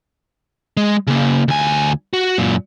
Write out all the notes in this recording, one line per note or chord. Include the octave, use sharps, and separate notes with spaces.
G#3
C#3 A#3
D2 G#5
F#4
F#2 A#2